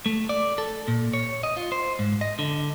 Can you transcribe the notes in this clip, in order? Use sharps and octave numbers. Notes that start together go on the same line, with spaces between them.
A3
D5
A4
A#2
C#5
D#5
F4
C5
G#2
D#5
D3